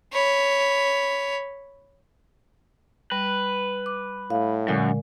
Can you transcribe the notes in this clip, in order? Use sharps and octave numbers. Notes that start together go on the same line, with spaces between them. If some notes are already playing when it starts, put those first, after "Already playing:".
C#5 B5
G3 B4
D6
A2 F5
F#2 A#2 D3 G#3